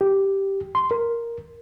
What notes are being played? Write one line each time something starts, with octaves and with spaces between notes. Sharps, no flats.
G4
C6
A#4